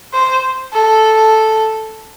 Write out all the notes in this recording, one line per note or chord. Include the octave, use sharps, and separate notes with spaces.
C5
A4